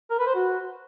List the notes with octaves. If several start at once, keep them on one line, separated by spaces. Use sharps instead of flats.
A#4
B4
C5
F#4